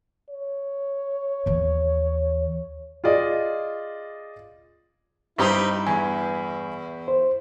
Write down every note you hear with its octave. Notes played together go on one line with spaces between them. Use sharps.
C#5
D#2 E3
F4 G#4 D5 D#5
G2 C4 D#4 E4 G4 A#5
E2 G#5
C5